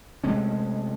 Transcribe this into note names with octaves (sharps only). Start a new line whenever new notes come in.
C3 G#3 A3 C#4